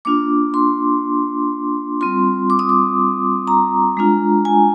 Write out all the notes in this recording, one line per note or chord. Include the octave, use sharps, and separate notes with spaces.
A#3 D4 F4 D6
C6
G3 C4 F4 C6
D6
D#6
D6
A#5
G#3 D4 F4
G#5